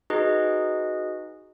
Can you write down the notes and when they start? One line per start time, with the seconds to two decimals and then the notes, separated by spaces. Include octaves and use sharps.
0.10 D#4 F#4 G#4 B4 D#5